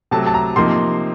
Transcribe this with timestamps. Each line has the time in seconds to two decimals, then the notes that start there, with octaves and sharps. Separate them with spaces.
0.11 C3 F#3 A3 A5
0.26 A5
0.34 A#5
0.56 C3 F3 A#3 D#4 C6